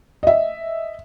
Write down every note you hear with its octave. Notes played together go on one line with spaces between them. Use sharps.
D#5 E5